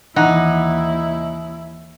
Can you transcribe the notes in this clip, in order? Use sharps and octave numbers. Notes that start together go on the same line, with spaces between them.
D#2 D#3 E3 D#4 E4 F#5